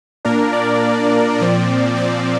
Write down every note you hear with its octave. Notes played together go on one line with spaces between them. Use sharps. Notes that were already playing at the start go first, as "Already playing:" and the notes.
A#2 A#3 D4 A#4
D5
A#2 F3 C4 D5
D5